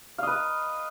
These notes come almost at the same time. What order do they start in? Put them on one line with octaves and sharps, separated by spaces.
F5 D#5 B4